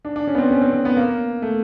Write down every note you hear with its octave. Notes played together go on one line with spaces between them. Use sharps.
D4
D4
C#4
B3
C4
C#4
C4
C4
B3
A#3
A3